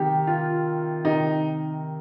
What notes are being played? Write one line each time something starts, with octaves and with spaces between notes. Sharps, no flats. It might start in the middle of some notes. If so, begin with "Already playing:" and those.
Already playing: C3 D#3 G4
F4
C3 D#3 D#4